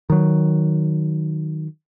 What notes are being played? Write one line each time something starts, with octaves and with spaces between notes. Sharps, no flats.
D#3 F#3